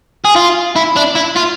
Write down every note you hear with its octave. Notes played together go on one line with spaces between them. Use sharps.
G#4
F4
E4
D4
E4
F4